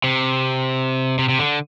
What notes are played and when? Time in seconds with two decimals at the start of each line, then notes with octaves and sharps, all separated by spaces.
0.04 C3
1.19 C3
1.29 C3
1.39 D3